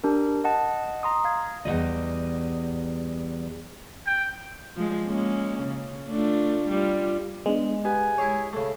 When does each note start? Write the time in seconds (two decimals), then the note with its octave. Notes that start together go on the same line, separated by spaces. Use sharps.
0.04 D4 G4 A#4
0.44 D#5 F#5 A5
1.03 A#5 C6 D#6
1.25 F5 G#6
1.65 E2 G2 G3 D#5
4.07 G5
4.76 F3 G#3
5.06 G#3 A#3 C#4
5.63 C#3
6.09 A3 D4 F4
6.69 G3 F4
7.46 G#3 B3 D4
7.85 B3 G4 G#5
8.18 E4 G#4 C#5
8.53 C#3 A3